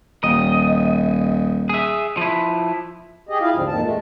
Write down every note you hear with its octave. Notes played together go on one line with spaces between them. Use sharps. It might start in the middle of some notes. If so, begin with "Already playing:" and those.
D#1 D#5
G#4 E5
F3 E4
G4 G#4 D#5
E4 F4 G#4 F5
D2 G#2 D3 F3 G3 C4
F2 A#2 D#3 A5
G#3 A3